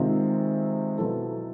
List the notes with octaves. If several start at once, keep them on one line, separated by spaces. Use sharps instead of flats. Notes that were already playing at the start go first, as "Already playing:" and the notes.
Already playing: C3 D#3 G#3 C4 F4
B2 F#3 B3 E4 A4